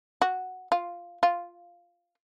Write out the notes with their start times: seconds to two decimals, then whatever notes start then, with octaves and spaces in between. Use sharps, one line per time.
0.22 F#4
0.72 F4
1.23 F4